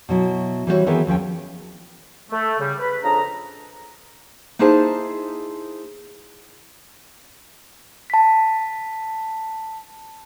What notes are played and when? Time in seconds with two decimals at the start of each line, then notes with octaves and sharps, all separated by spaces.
0.09 B2 F#3 E4
0.67 E3 G3 C4 D4 F#4 C#5
0.86 D#3 E3 B3 C4 G#4 B4
1.07 D#2 F3 C#4 G5
2.31 A3
2.59 C#3 G3
2.79 B4
3.03 F2 C#3 D4 G#4 A#5
4.59 A#3 D#4 E4 G#4 C5 A5
8.10 A5 B6